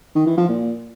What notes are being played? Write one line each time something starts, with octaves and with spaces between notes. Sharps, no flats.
D#3
E3
F3
A#2